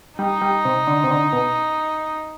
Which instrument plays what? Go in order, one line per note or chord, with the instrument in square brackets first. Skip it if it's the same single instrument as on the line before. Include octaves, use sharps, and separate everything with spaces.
[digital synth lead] G3 [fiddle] D#4
[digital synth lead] G3
C3
D3
C3
D3
B2